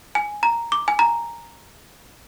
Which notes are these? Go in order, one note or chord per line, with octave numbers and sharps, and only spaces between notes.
G#5
A#5
D6
G#5
A#5